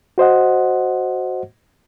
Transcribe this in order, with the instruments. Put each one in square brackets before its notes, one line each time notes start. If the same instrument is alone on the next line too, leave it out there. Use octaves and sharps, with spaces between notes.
[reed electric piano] F#4 C5 D#5 F#5